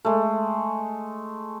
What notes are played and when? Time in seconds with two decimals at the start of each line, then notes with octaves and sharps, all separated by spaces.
0.05 G#3 A3